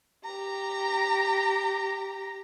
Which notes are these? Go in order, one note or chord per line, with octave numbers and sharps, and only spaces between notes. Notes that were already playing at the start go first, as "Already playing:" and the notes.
G4 A#5